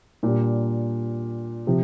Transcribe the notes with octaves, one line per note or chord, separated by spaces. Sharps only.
A#2 G3 D4
C3 F3